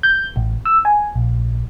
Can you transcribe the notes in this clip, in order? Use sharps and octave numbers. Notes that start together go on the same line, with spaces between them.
G6
A1
E6
G#5
A#1